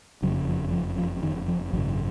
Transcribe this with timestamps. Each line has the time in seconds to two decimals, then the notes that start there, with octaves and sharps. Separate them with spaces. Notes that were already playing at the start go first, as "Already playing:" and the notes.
0.23 F#1 F2 C#3 F#3
0.48 F3
0.72 F3
0.98 F3
1.23 D#3
1.48 F3
1.73 G#1 F#2 C#3 F#3